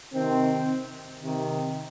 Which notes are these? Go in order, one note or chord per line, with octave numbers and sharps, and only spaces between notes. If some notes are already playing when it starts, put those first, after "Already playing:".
C3 D#3 C4
C3 D#3